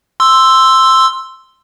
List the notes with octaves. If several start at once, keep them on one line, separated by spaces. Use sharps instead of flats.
C6 E6